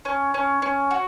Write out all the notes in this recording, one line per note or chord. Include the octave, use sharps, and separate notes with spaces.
C#4
C#4
C#4
F#4